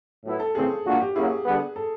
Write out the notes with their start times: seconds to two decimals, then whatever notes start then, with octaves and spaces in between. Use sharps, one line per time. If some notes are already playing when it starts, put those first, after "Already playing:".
0.25 A2 F#3 B3 E4
0.40 A4
0.55 C#3 E3 A3 C4 G#4
0.85 A#2 F3 A#3 D4 F#4
1.00 G4
1.15 F#3 A#3 C#4 E4 G#4
1.45 D3 G3 B3
1.76 A4